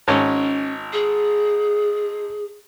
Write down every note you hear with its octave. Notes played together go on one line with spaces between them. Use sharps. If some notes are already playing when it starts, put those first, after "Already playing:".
G#1 C#4 C#5
G#4